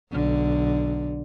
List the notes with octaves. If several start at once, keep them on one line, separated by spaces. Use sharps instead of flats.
B1 D3